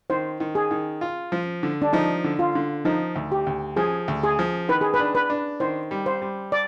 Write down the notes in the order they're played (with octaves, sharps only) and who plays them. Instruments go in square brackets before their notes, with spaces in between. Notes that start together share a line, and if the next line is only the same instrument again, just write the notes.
[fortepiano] D#3 [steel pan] C5
[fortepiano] D#3
[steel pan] G#4
[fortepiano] D#3
F4
F3
D3
[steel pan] D4
[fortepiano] F3 [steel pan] D#4
[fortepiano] D3
[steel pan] F4
[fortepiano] D3
[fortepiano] F3 [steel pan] D#4
[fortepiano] D2
[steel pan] G4
[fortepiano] D2
[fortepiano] F3 [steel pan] G#4
[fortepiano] D2
[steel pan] G#4
[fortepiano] F3
[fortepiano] D#3 [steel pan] B4
[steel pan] G#4
B4
[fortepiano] D4
[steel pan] B4
[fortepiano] D4
[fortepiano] D#3 [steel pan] C5
[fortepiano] G3
[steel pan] C5
[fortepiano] G3
[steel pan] D5